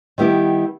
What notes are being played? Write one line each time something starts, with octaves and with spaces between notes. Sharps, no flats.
D#3 G3 B3 E4 G4